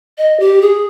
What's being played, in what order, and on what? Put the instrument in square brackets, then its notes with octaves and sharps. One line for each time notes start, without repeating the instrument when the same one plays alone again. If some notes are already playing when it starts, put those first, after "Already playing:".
[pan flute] D#5
G4
G#4